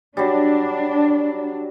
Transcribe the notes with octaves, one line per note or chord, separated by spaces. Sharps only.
F#3 G3 D4